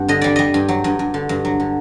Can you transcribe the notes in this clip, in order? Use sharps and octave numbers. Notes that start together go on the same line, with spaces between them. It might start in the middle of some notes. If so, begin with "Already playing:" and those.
Already playing: G2 C4 F#5
D3 D#5
G3 D5
G3 D#5
G2
F#3
G2
G2
D3
G2
F#3
D3